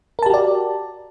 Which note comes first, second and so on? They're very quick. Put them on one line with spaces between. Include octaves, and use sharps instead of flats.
A#4 A5 G4 F#4 D5